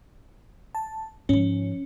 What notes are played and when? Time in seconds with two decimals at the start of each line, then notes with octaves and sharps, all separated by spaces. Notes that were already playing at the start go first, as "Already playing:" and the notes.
0.75 A5
1.29 G#2 F3 C#4